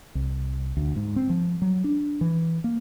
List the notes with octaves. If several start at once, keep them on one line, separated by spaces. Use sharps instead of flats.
C2
D2
G#2
C4
F3
F#3
D4
E3
A#3